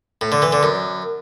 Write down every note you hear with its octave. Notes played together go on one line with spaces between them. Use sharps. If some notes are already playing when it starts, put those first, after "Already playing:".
A2
D3
E3
D3
F#2